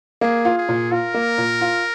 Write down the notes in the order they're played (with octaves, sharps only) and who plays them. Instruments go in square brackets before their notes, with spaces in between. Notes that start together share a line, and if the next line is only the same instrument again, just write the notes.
[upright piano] A#3 [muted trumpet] G#4
[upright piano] F4
[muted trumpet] G#4
[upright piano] A#2
[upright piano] F4 [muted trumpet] A#4
[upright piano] A#3
A#2
F4